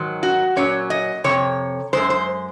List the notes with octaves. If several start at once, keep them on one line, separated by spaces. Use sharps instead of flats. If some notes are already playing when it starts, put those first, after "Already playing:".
Already playing: G#2 D#3 F#3
F#4
A#2 F#3 C#4 C#5
D#5
F2 C3 C#5
F#2 C#3 G#3 C5
C5